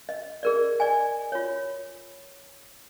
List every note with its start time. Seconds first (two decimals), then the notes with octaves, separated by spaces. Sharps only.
0.09 D#5
0.43 G#4 A#4 D5
0.80 D5 D#5 G#5
1.32 F4 C#5